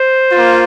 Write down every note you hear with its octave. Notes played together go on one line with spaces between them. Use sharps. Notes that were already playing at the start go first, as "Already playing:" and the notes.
Already playing: C5
A#3 F4